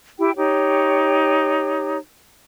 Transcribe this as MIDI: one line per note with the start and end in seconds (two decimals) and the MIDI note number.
0.18 0.31 64
0.18 0.31 67
0.18 0.31 79
0.37 1.97 63
0.37 1.97 67
0.37 1.97 73